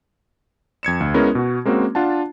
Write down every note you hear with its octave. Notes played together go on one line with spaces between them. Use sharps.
F2 G#6 C#7 E7
D2
G#3 B3 C#4 E4 A#4
B2 F#4
G#3 A#3 C4 C#4 F#4
D4 F4 F#5 A5